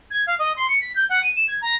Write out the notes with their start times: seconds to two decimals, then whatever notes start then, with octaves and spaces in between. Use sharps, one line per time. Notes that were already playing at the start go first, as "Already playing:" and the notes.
0.11 G#6
0.27 F5
0.39 D#5
0.56 C6
0.68 C#7
0.81 B6
0.95 G6
1.09 F#5
1.23 D#7
1.36 E7
1.48 G#6
1.62 A#5